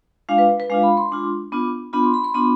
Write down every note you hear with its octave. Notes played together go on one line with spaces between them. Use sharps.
G#3 D4 F4 F5
B4
B4
G#3 D4 F4 F5
B5
C6
G#3 D4 F4
B3 D4 F4
B3 D4 F4 B5
C6
B5
C6
B3 D4 F4 B5